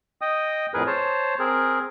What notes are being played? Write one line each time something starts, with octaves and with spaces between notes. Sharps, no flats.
D#5 G5 D#6
F2 A2 G#4 A#4 B4
C5 C#5 A5
C4 G#4 A#4